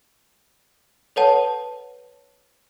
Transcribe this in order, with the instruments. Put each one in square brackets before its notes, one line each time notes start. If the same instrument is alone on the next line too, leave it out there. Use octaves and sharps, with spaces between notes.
[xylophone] A4 B4 C#5 F#5 A5